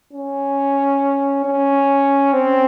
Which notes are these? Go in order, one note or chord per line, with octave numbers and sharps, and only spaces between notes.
C#4
C#4
C4